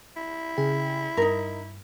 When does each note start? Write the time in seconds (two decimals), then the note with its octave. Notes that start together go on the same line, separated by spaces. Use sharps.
0.16 E4
0.57 C#3 G#4 G5
1.17 G2 D#4 A#4